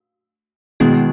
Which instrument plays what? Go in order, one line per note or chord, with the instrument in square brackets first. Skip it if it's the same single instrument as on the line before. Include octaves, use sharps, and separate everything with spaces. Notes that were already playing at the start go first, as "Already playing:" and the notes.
[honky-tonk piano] B2 [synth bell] D#3 G#3 B3 E4 G#4